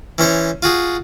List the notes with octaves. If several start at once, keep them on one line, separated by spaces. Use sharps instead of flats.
E3 C#4 C5 C#5
F4 F#4 G#4